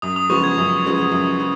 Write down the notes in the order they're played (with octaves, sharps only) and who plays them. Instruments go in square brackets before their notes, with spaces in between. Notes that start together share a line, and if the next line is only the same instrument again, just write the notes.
[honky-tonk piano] F#2 [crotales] D#6
[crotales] D#6
[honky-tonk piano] C#3 F3 G#3 B3 [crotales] C#6
[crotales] G#6
[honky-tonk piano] F#2
C#3 F3 G#3 B3
F#2
C#3 F3